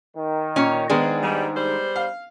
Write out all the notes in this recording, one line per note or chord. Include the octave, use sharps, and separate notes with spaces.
D#3
A#2 C#4 C#5
G#2 D#3 G#3 B3 D4 G#4
G3
G3 C5
F5